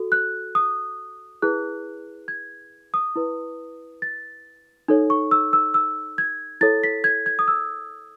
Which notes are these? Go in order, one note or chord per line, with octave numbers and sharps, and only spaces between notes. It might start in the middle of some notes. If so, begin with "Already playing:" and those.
Already playing: F#4 A4
F#6
D#6
E4 G#4 B4 F#6
G#6
D#6
E4 B4
A6
D#4 A4 C#5
C#6
E6
E6
E6
G#6
E4 A4 C#5 A6
B6
G#6
G#6
D#6
E6